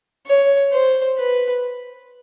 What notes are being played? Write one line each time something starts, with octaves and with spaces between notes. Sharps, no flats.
C#5
C5
B4